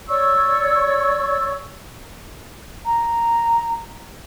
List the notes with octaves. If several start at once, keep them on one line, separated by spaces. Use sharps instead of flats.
C#5 D5 C#6 E6
A#5